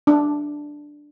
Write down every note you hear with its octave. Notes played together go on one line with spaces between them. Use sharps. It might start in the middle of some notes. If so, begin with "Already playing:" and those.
D4